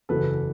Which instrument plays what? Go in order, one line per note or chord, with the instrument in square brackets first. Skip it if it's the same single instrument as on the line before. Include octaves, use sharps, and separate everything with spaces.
[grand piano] F#1 E2 C#3 F#3 A4 B4